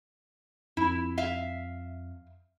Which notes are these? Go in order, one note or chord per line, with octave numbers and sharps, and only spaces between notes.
F2 E4
E5 F5